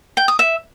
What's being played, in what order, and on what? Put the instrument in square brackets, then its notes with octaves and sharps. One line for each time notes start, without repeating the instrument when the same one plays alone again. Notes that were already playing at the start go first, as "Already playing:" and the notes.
[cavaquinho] G5
D#6
E5